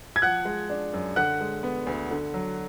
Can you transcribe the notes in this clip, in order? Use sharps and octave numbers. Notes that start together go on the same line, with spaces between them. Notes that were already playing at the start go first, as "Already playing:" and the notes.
G#6
F3 F#5 F#6
G#3
D4
F#2
D3 F#5 F#6
G#3
B3
D2
D3
F#3